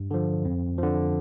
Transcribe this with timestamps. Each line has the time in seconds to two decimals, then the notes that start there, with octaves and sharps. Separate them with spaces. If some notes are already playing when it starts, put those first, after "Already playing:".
Already playing: G2
0.11 D3 F3
0.45 F2
0.78 D3 F3